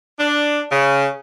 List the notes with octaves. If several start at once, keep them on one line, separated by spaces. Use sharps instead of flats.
D4
C#3